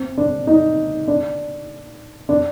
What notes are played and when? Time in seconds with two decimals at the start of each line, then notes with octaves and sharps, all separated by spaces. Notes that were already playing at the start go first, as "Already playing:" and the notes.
Already playing: C4
0.18 D4
0.47 D#4
1.08 D4
2.29 D4